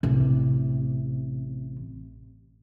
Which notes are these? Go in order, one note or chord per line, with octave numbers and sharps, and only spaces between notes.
A1 C3